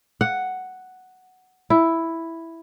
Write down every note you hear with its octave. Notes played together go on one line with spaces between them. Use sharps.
F#5
E4